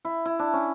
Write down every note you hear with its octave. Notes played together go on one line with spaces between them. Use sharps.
E4
E4
D4
C#4